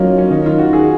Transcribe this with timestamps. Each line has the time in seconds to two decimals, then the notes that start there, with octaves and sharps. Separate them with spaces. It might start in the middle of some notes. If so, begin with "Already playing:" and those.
Already playing: F#3 A#3 C#4 D#4 F4
0.18 C#4
0.31 D#3 D#4
0.46 F4
0.59 F#4
0.73 G#4